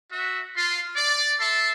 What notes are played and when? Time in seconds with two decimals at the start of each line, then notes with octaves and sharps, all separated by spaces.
0.11 F#4 E5
0.57 F4 C6
0.95 D5
1.39 A4 E5 A5 C6